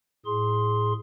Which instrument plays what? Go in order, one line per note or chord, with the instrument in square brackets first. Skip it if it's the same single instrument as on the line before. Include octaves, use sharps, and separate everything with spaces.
[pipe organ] A2 G#4 C6